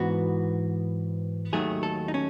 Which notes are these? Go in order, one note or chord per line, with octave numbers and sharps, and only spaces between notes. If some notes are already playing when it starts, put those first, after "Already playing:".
Already playing: G#2 E3 B3 F#4
D#2 D#3 F#3 A3 G#4
A4
D#4
C#4